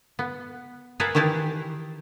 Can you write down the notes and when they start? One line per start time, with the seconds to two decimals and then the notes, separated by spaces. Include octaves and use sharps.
0.19 B3
1.00 G#4 A#4 B4 E5 F#5 A5
1.15 D#3 E3 E4 G4 A5